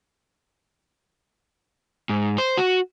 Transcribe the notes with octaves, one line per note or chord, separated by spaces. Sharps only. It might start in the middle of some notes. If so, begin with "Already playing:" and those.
G#2
C5
F#4